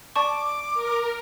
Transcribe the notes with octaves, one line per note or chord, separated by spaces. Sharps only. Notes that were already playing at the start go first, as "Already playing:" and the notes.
D5 A5 C#6 D6
A#4